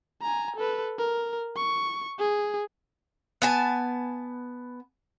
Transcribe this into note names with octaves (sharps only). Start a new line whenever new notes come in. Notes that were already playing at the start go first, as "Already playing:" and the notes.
G#5 A#5
A4 B4
A#4
C#6
G#4
B3 G#5 A5